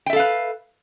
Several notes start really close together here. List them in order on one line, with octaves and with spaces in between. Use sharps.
G5 E5 A4 F5 B4